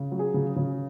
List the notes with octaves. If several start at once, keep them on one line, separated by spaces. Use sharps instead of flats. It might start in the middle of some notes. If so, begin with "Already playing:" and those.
Already playing: C#3
F#3
G#4
C#3
C#3